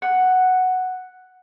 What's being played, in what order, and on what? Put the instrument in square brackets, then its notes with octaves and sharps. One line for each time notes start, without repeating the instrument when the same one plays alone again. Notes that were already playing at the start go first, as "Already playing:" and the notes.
[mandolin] F#5